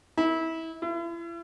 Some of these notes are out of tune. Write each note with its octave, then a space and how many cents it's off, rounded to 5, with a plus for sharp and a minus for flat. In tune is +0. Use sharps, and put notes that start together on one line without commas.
E4 -25
E4 +40